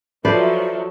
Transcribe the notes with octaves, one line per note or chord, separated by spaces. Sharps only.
F3 F#3 A4 B4 C5 D5 E5